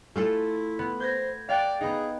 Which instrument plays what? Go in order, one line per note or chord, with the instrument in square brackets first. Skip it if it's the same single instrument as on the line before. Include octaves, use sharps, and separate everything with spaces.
[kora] A3 F4 A4 [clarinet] E4
[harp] B3
[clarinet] C5 [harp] G6 G#6 A#6
[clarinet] D5 [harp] F5 G5 F#6
[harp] B3 D#4 [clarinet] G#4